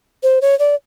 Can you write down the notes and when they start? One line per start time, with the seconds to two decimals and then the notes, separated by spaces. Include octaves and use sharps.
0.23 C5
0.42 C#5
0.59 D5